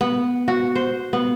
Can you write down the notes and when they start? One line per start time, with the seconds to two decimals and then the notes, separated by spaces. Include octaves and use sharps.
0.01 B3
0.48 F#4
0.76 C5
1.13 B3